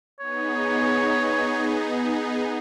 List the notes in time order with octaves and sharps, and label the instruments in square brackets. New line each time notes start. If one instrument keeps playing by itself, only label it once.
[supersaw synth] B3 D#4 G#4 [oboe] C#5